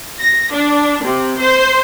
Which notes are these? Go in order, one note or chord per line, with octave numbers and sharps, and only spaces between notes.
A#6
D4
C3
C5